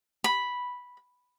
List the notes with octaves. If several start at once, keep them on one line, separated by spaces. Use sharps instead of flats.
B5